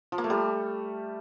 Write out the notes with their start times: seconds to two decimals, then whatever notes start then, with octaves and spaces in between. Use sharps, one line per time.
0.12 F3
0.18 A#3
0.24 A3
0.30 G3